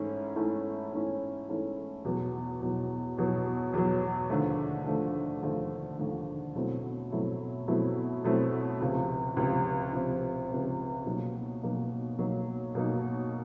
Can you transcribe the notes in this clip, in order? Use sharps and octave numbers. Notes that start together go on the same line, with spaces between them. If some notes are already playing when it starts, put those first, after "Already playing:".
Already playing: G#2 E3 A3 C#4 E4
G#2 E3 A3 C#4 E4
G#2 E3 A3 C#4 E4
G#2 E3 A3 C#4 E4
E2 B2 F#3
E2 B2 F#3
E2 B2 F#3
E2 B2 F#3
D#2 D3 F3 A3
D#2 D3 F3 A3
D#2 D3 F3 A3
D#2 D3 F3 A3
B2 F#3 A3 C4 E4
B2 F#3 A3 C4 E4
B2 F#3 A3 C4 E4
B2 F#3 A3 C4 E4
C#2 C3 F3
C#2 C3 F3
C#2 C3 F3
C#2 C3 F3
B2 F#3 A#3 D#4
B2 F#3 A#3 D#4
B2 F#3 A#3 D#4
B2 F#3 A#3 D#4